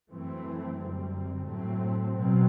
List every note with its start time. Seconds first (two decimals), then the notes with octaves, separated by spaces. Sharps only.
0.10 F#2 E3 A3 C4
0.78 F#2 D3 G3 C4
1.45 A2 F#3 A3 C4
2.14 B2 F#3 C4